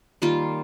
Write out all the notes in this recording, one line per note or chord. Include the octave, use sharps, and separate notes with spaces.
D#3 G3 A#3 F4